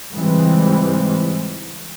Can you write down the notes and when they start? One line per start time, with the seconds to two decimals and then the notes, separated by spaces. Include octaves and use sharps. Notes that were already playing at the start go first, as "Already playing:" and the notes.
0.12 C#2 G#2 E3 G3 G#3 C4